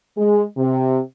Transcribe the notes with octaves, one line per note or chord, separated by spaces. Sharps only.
G#3
C3